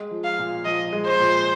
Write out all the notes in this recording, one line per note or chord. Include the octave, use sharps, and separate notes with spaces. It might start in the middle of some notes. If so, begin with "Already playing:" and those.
Already playing: G#3
F3
F5
A#2
F3 D#5
G#3
C5
A#2